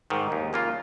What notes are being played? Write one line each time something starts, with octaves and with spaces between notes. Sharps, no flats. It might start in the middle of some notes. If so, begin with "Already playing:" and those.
G#2 D#3
D#2
C#3 A#3 F4